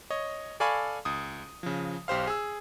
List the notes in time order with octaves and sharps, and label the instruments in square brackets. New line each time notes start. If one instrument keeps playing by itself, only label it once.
[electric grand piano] C#5 D#5
A4 D5 F5 G#5 B5 C#6
C#2 D#6
C#3 F3
B1 G4 C5 F5
G#4 E6